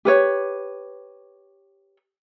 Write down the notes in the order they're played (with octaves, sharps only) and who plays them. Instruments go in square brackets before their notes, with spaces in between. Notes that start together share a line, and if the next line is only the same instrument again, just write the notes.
[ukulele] G4 B4 C#5